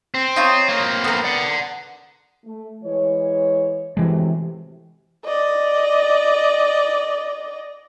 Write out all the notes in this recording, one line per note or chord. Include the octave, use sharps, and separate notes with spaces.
C4
D#4 F4 C#5
A#3 C4
B3 A#4
D5 F#5
A3
E3 G#3 C#5
F#2 A2 C3 E3 G#3
D5 D#5